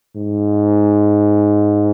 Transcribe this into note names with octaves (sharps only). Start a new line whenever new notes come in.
G#2